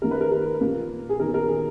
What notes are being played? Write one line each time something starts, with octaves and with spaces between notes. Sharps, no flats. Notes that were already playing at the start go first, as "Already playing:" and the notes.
D#3 A#3 A#4
B4
A#4
A#4
A#2 A#3
G#4
D#3 F#3 B3 A#4
A#4
G#4